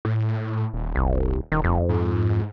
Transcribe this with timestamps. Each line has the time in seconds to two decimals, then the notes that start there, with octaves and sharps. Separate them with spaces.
0.05 A2
0.74 D#1
0.96 C2
1.52 D#1 D#3
1.64 F2
1.89 G#2